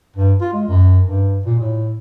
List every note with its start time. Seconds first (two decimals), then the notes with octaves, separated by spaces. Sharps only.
0.16 G2
0.41 F4
0.53 G#3
0.68 F#2
1.06 G2
1.46 A#2
1.60 A2